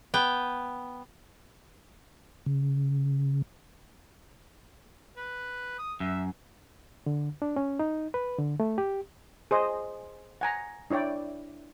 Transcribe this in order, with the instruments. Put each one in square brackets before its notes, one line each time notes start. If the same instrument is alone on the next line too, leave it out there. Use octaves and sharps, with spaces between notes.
[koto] B3 G5
[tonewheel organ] C#3
[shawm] B4
D#6
[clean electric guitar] F#2 [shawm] E5
[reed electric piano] D3
D4
C#4
D#4
B4
D3
A3
G4
[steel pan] G#4 C5 D#5
F#5 G#5 A#5
D4 E4 C#5 D5 G5